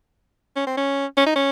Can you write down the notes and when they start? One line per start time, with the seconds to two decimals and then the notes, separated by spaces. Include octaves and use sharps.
0.56 C#4
0.67 C4
0.77 C#4
1.17 C#4
1.26 D#4
1.35 C#4